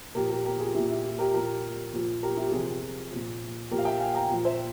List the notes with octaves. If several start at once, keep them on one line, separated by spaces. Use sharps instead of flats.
A#2 F3 G4 A#4
G4 A#4
G4 A#4
F4 G#4
A#2 F3 E4 G4
E4
F4
G4 A#4
A#2 F3 G4 A#4
A#2 F3
G4 A#4
E4 G4
G4
C3 F3 F4 G#4
A#2 F3
A#2 F3 G4 A#4
F5
E5 G5
F5 G#5
G5 A#5
A#2 F3
C5 E5